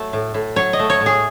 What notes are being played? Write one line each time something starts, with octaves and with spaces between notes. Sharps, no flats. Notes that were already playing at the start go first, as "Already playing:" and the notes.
Already playing: F#3 A3
A2
A2
F#3 C#5
D#5
A3
C#5
A2
G#4